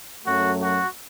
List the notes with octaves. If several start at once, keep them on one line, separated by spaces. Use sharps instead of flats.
F#2 F#3 A3 F#4
F#4